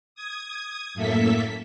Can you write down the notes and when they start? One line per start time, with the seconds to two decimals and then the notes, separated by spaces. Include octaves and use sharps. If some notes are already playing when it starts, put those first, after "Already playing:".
0.15 D#6 G#6
0.94 F#2 A2 A#3 A4 E5 B6